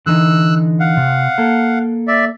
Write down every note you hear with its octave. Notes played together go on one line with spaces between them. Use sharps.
D3 E3 D#4 E6 F#6
F5 F#5
C3
A#3 A4
D5 E5